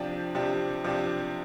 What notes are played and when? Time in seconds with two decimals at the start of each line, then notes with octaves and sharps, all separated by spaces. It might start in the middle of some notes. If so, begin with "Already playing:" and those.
Already playing: C3 F3 D4 G4
0.35 C3 F3 D4 G4
0.84 C3 F3 D4 G4